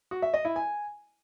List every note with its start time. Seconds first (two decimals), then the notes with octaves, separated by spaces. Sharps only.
0.11 F#4
0.22 E5
0.34 D#5
0.45 E4
0.56 G#5